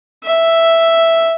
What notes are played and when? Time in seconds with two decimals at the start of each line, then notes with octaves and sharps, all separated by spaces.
0.24 E5